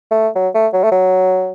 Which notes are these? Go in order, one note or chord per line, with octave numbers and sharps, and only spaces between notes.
A3
F#3
A3
F#3
A3
F#3